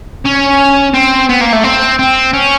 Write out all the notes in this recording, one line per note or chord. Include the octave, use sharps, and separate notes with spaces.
C#4
C4
B3
A#3
A3
C4
C4
C#4